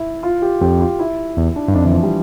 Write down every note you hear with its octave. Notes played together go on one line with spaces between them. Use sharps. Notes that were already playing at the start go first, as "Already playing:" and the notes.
Already playing: E4
F4
G4
F2 G4
F4
E4
E2
D4
G2
F2 D4
E3
F3
G3